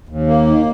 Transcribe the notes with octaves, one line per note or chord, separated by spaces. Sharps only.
D#2
A#3
D#3